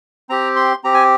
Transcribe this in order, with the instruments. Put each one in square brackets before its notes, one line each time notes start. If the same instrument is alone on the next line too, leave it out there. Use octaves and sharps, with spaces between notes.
[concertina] C4 G4 A#5
C6
C4 G4 A#5
G#5